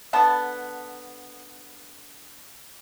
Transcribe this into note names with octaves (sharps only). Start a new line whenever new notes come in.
D3 B3 A5